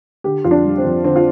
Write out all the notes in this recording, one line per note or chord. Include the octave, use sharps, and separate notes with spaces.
D3 G4
F2 F4
D4
G3
C4
F2
D3 C4
F4